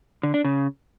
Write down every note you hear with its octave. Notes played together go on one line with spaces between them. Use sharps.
D3
D4
C#3